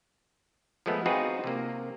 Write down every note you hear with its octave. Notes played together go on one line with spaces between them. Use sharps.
F3 G#3 A3 B3
C4 D#4 F4 F#4 G#4 B4
C3 A#3